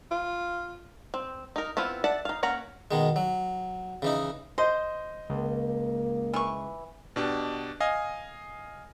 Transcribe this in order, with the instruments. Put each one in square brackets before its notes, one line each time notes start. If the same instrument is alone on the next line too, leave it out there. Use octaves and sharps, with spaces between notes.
[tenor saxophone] F4
[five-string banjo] C4
D#4 A#4
B3 C4 E4 F4
D5 E5 F#5 A5
D#4 F5
A#3 C#4 F#5 A#5
[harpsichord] B2 D#3 G#3
F#3
C#3 E3 D#4
[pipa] C5 [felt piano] D#5
[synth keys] C#2 [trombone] A#3
[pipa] E3 C#6
[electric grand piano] B2 D4 G4
D#5 F5 G#5